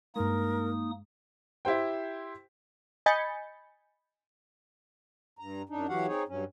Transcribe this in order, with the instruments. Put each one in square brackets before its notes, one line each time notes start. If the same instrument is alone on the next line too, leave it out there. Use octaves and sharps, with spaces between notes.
[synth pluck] G2 G#3 [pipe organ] A#3 D#4 D#6 [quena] A#4
[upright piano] E4 G4 C5 G5
[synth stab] D#5 G#5 B5 G6 A6 C#7
[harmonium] G2 A#5
F#2 D4 D#4
E3 F#3 F#4 G4 F5 F#5
C4 D#4 G#4 C#5
G2 F#3 C#4